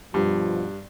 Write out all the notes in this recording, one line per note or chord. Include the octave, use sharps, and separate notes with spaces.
G2 B2 F3